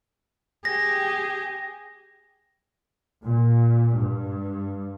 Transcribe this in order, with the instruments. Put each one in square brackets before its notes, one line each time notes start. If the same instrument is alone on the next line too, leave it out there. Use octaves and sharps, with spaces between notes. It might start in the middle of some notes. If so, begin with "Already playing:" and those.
[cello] G4 G#4 [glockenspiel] A#6
[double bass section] A#2
G2